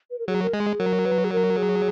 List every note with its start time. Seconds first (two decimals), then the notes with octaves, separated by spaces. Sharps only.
0.10 B4
0.19 A#4
0.28 F#3 G#4
0.43 A#4
0.54 G#3 G#4
0.80 F#3 A#4
1.06 B4
1.24 G#4
1.32 A#4
1.58 G#4